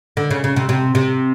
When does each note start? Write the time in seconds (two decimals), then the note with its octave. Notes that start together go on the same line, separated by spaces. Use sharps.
0.17 D3
0.31 C#3
0.44 C#3
0.56 C3
0.69 C3
0.95 C3